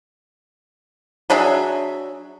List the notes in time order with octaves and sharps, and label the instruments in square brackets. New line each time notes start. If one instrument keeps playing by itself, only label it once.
[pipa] F#3 D4 G#4 E5